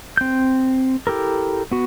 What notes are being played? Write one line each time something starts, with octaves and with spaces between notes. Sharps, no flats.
C4 G6
E4 G4 A4 A#4
B3 F#4